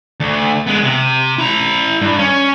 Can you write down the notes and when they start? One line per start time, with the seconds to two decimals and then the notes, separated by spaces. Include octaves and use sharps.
0.20 D2
0.67 G#3 B3
0.83 C3
1.38 E4 A#5
2.01 G2
2.18 C#4